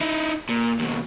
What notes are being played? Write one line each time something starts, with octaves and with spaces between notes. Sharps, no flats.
D#4 E4
A#2
D#2 B2